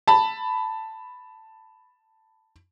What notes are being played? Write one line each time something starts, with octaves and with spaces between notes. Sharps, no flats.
A5 B5